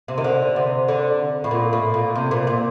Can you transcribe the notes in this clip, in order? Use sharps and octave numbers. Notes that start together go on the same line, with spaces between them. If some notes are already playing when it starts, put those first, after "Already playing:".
C3
D#3
D3
C3
D3
A2
A#2
A2
A#2
C3
A#2
A#2